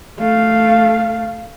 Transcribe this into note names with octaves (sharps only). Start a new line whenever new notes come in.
A3 F5